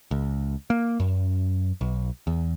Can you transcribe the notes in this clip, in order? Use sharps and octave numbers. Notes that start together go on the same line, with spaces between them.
C#2
A#3
F#2
B1
E2